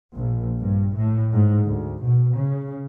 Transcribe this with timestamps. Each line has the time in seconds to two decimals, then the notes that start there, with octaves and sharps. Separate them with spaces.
0.13 A#1
0.59 G2
0.96 A2
1.33 G#2
1.65 D2
2.03 B2
2.36 C#3